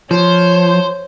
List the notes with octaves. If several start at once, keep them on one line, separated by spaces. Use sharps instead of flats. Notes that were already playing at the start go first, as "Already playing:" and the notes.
F3 C5 C#5